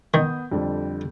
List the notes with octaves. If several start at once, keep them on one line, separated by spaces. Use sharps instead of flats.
D#3 B3 D#6 G6
F2 D3 G3